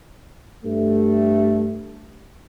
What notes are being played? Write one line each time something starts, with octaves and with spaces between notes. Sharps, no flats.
G2 G3 A3